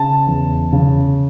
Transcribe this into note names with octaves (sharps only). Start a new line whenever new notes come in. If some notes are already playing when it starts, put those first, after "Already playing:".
Already playing: C#3 A5
E2
C#3